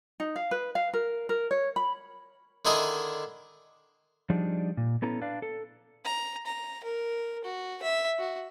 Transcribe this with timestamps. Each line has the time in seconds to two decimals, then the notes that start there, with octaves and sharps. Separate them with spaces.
0.20 D#4
0.36 F5
0.51 B4
0.75 F5
0.94 A#4
1.29 A#4
1.51 C#5
1.76 B5
2.65 D3 D#3 E4 G#4 D#5 C6
4.30 F3 G3 D4 D#4 G#4
4.77 A#2
5.02 B3 C#4 E4 A4 B4 A#5
5.21 D4 B4 D5 F5
5.42 A4
6.05 A#5
6.46 A#5
6.84 A#4
7.45 F#4
7.83 E5
8.19 F#4